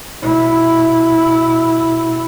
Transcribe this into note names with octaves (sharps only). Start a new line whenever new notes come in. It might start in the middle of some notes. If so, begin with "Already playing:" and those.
B2 E4